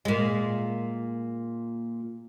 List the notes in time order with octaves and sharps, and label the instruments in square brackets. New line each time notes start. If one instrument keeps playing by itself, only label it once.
[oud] A#2 G#3